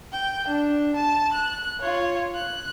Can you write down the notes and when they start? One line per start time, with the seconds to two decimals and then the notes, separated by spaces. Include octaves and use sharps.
0.12 G5
0.48 D4
0.96 A5
1.33 F#6
1.80 F4 C#5
2.35 F#6